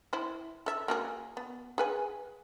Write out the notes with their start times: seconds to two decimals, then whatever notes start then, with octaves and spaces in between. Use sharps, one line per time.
0.13 E4 C5
0.66 A4 E5
0.88 A#3 F#4 G#4
1.37 B3
1.78 G#4 B4 G#5